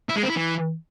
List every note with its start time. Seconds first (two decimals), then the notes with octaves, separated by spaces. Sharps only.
0.09 E4
0.16 G#3
0.23 C4
0.30 E4
0.37 E3